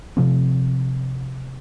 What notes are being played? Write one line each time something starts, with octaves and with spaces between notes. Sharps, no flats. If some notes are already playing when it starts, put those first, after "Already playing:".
C3 F3 C4